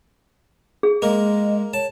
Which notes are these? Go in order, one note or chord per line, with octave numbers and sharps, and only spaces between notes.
G#4
G#3 A#3 D#5
C#5 A5